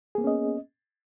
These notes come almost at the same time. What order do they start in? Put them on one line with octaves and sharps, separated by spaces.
G#4 A#3 B3 C#4 D#5